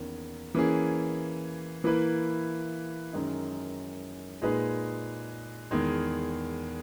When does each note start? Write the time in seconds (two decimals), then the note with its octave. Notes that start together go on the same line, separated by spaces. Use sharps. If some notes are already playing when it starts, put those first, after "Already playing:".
Already playing: E2 D#3 A#3 C#4
0.54 E3 A#3 C#4 G#4
1.84 E3 A#3 E4 B4
3.13 F#2 D#3 G#3 D#4
4.42 A#2 G#3 D#4 G#4 B4
5.71 E2 D#3 G#3